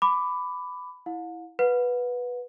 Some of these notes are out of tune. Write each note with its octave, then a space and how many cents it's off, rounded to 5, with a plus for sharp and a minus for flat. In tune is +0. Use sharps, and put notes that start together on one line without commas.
B5 +15 D6 +0
E4 -5 F5 +45
B4 -5 F#5 -35